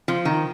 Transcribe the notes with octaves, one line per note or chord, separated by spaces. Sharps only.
F3
D#3